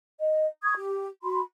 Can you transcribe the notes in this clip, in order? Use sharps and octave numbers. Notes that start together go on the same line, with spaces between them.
D#5
C#6 D#6 G#6
G4
F#4 B5 C6